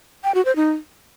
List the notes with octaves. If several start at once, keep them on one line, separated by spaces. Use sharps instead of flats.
G5
F#4
C5
D#4